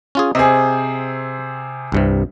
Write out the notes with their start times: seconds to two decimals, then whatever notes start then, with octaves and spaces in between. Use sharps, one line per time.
0.15 C#4 F4 G#4
0.35 C3 C4 G#4 D#5
1.92 C2 G2 C3